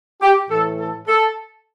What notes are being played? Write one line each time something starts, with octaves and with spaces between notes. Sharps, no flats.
G4
A2 E3 A3 A4
A4
A4